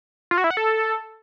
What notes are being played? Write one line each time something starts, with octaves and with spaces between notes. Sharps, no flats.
F4
F#4
E4
F#5
A4